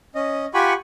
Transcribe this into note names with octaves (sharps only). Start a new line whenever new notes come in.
C#4 D#5
F4 G4 F#5 G#5 B5 C#6